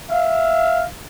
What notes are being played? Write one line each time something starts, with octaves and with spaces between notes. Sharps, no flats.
E5 F5